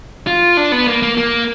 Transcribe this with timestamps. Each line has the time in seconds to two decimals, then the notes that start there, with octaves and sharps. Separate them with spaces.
0.27 F4
0.57 D4
0.72 B3
0.87 A#3
1.03 A#3
1.17 A#3